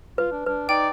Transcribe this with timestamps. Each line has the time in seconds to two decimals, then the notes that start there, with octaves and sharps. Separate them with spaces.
0.18 F4 B4
0.32 D4
0.46 D4 B4
0.69 D#4 D5 G5